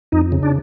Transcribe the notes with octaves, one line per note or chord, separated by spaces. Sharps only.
F2 D#4
C#3
D4